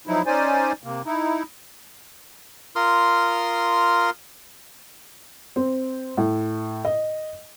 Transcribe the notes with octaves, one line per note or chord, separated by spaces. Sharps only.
F3 F#3 D#4 E4
C#4 D#4 C5 D5 G#5
C3 A#3
D#4 E4
F4 A#4 C6 D#6 F6
C4
A2
D#5